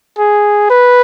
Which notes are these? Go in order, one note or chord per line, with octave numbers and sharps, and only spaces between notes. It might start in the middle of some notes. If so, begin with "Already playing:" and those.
G#4
B4